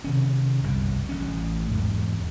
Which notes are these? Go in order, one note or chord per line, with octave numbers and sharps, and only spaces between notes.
C3 D#3 C#4
G1 C2 F#2
A1 C#4
E2 G#2